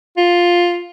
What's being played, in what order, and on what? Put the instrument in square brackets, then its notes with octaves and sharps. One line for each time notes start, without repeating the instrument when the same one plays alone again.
[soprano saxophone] F4